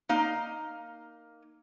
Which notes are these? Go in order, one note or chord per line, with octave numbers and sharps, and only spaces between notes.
A#3 D#4 F5